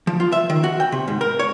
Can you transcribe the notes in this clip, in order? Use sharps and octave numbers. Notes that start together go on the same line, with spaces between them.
F3
F4
E5
D#3
F#4
G5
C3
G#2
A#4
C#5